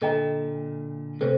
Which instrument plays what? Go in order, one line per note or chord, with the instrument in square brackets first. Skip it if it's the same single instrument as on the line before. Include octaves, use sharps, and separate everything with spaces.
[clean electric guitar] A#2 D3 [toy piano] A4 D#5 G5 A#5
[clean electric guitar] A2 C3 [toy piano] A4 C5